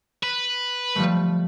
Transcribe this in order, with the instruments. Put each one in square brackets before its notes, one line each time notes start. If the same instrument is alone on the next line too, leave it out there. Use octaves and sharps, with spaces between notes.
[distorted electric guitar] B4
[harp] F3 G3 A3